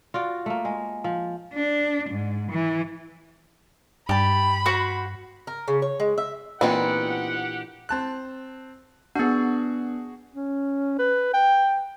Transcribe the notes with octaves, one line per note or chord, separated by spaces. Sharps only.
F4 F#4 D5
A3 A#3
G#3
F3
D4
G#2
E3
G2 G4 A5 B5
F#4 C5 F#5
A#4
C#3
C#5
G#3
E5
A#2 E3 B3 C4 D4 D#4 G4 F#5
C4 A5 F#6
B3 D4 F#4 G#4
C#4
B4
G5